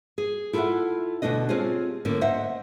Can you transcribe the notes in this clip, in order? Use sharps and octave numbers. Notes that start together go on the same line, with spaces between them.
G#4
E4 F4 A4 C#5 E5 F#5
D2 G#2 B2 A3 D4 D#5
C4 C#4 F4 G4 G#4 C5
A2 D3 A#3 C#4 D5
C5 D#5 E5 F#5